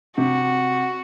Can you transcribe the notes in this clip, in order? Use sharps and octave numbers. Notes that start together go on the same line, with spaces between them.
C3 F#4